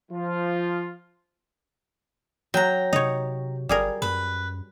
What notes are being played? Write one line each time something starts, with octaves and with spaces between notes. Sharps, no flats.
F3 F4
F#3 G5 A#5
C3 D#4 C#5
G1 G3 G#4 A#4
F#2 B4